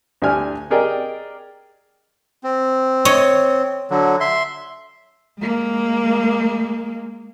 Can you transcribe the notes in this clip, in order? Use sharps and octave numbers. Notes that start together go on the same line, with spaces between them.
D2 D4 G4 G#5 F6
G4 G#4 A#4 D5 D#5 G5
C4
C#5 D#5
D3 F#3
E5 C6
G#3 A#3